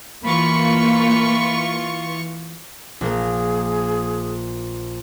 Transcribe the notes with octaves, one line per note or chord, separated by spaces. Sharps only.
E3 A#3 F4 B5 C#6
A#1 A#3 G#4 A#4